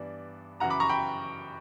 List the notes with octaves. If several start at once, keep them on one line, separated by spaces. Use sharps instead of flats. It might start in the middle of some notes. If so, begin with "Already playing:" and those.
Already playing: G2 E3 B3 D4 D5
F#2 C#3 E3 F#5 A#5
B5 D6
A#5 C#6
G5 B5